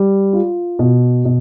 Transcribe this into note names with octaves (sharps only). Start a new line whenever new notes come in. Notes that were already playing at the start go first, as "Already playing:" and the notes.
Already playing: G3
F4
B2
B2